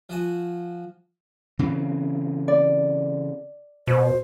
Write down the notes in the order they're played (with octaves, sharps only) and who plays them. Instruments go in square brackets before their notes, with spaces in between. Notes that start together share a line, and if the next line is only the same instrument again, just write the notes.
[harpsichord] F3 F#4 G#5
[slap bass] C#3 E3 C4
[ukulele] D5
[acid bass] B2 [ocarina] C5